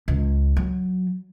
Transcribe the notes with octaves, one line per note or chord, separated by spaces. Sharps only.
C#2
F#3